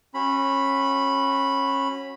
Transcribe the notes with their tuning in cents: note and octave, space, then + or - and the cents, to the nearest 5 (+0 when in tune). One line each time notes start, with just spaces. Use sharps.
C#4 -25 F#4 +0 B5 +0